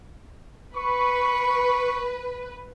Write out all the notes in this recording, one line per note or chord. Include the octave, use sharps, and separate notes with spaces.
B4 B5 C#6